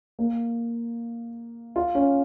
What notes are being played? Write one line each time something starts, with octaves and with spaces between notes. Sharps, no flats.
A#3
F4
C#4